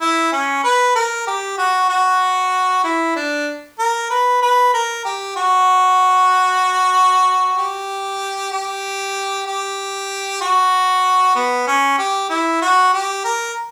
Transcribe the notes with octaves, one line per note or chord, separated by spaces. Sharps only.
E4
C#4
B4
A#4
G4
F#4
F#4
E4
D4
A#4
B4
B4
A#4
G4
F#4
G4
G4
G4
F#4
B3
C#4
G4
E4
F#4
G4
A#4